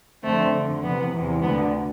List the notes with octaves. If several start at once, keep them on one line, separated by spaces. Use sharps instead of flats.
F2 D3 A3 C4
F2 D3
F2 C3 E3 B3
E2 C3 E3
D2 D3 B3